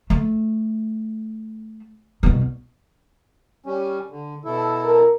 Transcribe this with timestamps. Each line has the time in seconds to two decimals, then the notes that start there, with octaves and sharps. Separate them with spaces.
0.10 A3
2.23 C2 B2
3.66 G3 C#4
4.11 D3
4.45 B2 E4 A4
4.85 A#4